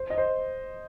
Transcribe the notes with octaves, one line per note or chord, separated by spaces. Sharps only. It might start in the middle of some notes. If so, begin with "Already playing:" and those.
Already playing: C5
D#5
C5